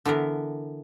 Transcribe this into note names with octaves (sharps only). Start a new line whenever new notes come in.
D3 E3 B3 A#4